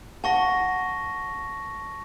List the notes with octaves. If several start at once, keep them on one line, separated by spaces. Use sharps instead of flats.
F#5 A5 C#6 A#6